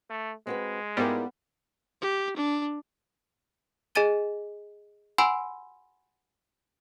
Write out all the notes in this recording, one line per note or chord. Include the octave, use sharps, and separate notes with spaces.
A3
G#3 C4 F#4 B4
G#2 G3 B3 E4 F4 A#4
G4
D4
G#4 D#5 G#5 A6 D#7 G7
F#5 G#5 B5 C6 E6 D7